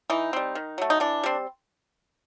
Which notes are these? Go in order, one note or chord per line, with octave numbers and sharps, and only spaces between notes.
E3 D#4
G3 C4
D#3
F#3 A3
D#4
E3 D4
G3 C4